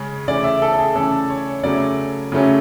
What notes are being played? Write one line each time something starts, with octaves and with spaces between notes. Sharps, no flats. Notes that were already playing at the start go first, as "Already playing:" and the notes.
Already playing: C#3 G#3 C#4
C#3 E3 A3 C#4 D5
E5
A4
A4
G#4
C#3 E3 A3 C#4 A4
C#5
C#3 F#3 A3 C#4 D5
C#3 F#3 A3 C#4